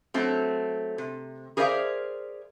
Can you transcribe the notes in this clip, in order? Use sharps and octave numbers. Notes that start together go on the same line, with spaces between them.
F#3 A3 C4
C3
G#4 A#4 C5 D5 E5 F5